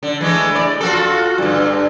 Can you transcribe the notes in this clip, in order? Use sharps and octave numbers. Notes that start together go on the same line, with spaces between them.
D3
E3 G#3 A3
D5
F4 F#4 A4
G2 D3